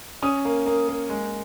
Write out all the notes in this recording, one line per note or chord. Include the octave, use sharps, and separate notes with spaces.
C#4 D#6
A#3
A#3
A#3
G#3